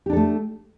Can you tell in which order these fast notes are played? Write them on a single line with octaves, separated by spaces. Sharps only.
G4 D4 A4 A3